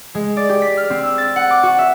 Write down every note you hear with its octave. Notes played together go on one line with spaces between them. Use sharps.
G#3
D5
G4
B6
F6
C4
E6
A6
F#5
D6
F#4
E5